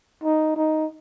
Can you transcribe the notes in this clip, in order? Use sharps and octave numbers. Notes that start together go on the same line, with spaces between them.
D#4
D#4